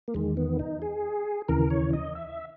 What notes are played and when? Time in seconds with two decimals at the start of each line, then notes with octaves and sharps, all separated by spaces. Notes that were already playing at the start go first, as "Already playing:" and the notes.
0.08 A#3
0.14 E2 D#3 G#3
0.37 B3
0.59 D#4
0.82 G#4
1.48 D#2 C#3 E3 A#4
1.70 C#5
1.93 D#5
2.15 E5